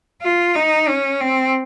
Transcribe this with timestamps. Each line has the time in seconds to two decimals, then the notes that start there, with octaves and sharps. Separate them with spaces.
0.22 F4
0.55 D#4
0.88 C#4
1.21 C4